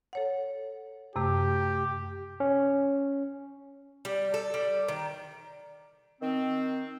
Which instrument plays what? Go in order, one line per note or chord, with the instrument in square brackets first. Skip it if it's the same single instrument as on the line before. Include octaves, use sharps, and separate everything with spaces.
[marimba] A4 C#5 F#5
[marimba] F#2 C3 A3 [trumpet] G4
[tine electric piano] C#4
[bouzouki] G3
A4
G3
D#3
[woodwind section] D#3 C4